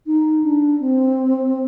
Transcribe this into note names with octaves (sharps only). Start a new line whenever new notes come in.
D#4
D4
C4